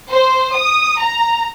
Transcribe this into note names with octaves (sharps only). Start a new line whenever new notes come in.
C5
D#6
A#5